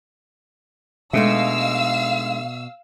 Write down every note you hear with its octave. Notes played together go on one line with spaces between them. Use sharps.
B2 G#3 A3 D4 D#4 E5 F5 E6